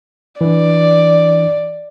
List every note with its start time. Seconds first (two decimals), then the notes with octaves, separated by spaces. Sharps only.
0.41 E3 D4 D5